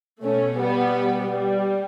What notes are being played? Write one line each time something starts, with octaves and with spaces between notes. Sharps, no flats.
B2 A3 C#4
G3 B3
G3